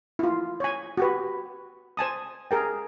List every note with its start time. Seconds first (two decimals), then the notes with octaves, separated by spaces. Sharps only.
0.19 E4 F4
0.60 C#5 G#5
0.98 F#4 G4 B4
1.97 C5 G#5 A5 D#6
2.51 G#4 A#4 G5